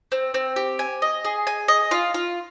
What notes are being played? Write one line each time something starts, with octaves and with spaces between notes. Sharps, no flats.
C4
C4
G4
G#5
D#5
G#4
G#5
D#5
F4
F4